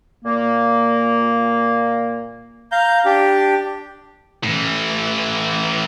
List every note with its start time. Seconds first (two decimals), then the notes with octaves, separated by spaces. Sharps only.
0.25 A#2 A#3
2.71 F5 A#5 G6
3.05 D4 G4
4.43 A2 E3